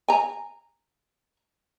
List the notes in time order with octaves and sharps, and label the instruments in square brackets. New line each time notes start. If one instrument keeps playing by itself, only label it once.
[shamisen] G#5 A#5